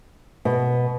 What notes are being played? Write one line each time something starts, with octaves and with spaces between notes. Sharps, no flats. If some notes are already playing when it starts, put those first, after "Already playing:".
B2